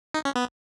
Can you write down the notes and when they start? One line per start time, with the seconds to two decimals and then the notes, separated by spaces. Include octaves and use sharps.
0.14 D#4
0.25 C#4
0.36 B3